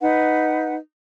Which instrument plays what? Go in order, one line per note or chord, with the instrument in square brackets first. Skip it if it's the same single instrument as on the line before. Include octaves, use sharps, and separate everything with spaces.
[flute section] D#4 B4 F#5